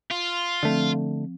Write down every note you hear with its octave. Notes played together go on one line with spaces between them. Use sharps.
F4
D3 F3 A3 C4